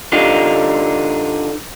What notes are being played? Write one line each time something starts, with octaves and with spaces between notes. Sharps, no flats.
D3 D4 D#4 F4 G4